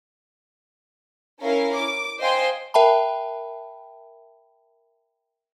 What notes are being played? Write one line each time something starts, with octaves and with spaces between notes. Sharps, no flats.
C#4 E4 A#4 F5
D6
C5 D#5 F5 G5 G#5 C6
A#4 E5 G5 A5 B5